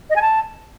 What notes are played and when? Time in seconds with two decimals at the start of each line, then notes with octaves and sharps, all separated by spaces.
0.10 D#5
0.16 G#5
0.22 A5